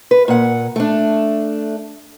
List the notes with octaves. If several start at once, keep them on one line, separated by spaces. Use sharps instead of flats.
B4
A#2 F#5
A3 D4